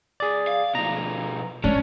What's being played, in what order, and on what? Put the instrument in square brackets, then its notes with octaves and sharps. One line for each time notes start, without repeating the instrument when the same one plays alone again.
[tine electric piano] G#4 D5
[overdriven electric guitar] F5
[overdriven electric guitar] B2 F3 [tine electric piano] A#5
[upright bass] G#3 [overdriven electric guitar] C#4 [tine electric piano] D4